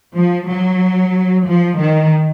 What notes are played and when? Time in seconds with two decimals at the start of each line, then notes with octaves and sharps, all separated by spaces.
0.16 F3
0.49 F#3
1.47 F3
1.79 D#3